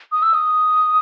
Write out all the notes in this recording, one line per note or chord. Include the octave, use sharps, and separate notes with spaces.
D#6
E6
D#6